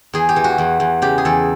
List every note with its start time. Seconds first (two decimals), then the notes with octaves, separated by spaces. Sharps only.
0.13 E2 G#4
0.29 G4
0.36 E3
0.44 F#4
0.58 E2
0.80 E2
1.02 C#3 G4
1.18 G#4
1.25 E2 A4